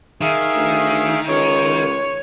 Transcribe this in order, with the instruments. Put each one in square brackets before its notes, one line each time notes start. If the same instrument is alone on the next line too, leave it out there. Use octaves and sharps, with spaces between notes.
[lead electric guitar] D#3 [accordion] G#4 E5 F5
[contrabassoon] D2
[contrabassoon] C#2 [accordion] G#3 [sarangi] C#5